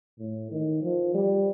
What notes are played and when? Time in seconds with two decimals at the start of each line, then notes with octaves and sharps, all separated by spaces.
0.19 A2
0.51 D#3
0.82 F3
1.14 G3